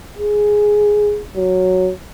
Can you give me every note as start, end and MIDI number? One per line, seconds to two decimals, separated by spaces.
0.19 1.21 68
1.36 1.91 54